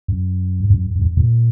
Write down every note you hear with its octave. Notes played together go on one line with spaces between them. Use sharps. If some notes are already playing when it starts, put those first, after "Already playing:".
F#2
G2
F#2
F#2
F2
A#2